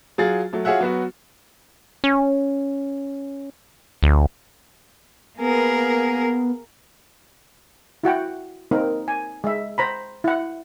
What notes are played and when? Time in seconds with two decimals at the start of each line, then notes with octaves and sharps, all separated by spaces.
0.18 F#3 F4 G#4 A6
0.53 F#3 A3
0.65 F4 F#4 G#4 C#5 E5 F#5
0.81 F#3 B3 F#4
2.04 C#4
4.03 D2
5.39 A#3 B3 G#4 A#4
8.03 E4 F#4 F#5 G5
8.71 A#3 C4 D#4 A#4
9.08 G#5
9.44 G#3 E5
9.78 C5 A#5 B5
10.24 E4 F#5